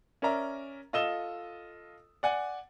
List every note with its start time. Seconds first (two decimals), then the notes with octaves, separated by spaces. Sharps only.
0.22 C#4 A#4 D5 E5 A#5
0.93 F4 A4 D#5 E6 E7 G7
2.23 D5 F#5 G#5